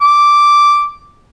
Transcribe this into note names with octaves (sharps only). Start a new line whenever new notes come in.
D6